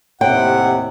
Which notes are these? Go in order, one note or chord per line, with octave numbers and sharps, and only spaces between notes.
D#2 A2 C3 C#5 F#5 G5